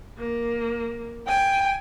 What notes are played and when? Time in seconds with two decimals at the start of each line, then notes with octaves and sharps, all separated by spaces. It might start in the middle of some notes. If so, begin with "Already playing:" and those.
0.18 A#3
1.28 G5 G#5